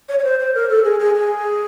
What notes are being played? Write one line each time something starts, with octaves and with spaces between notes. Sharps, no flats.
C#5
C#5
C5
C5
A#4
A4
G#4
G#4
G#4